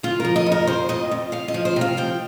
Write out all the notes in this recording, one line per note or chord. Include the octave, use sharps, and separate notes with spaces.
F3 F4
F3 A#4
D#5
F2
A#4
F2 C5
F2 D#5
F2
F3 F5
D#5
F3
C5
C3 F5
F3 G5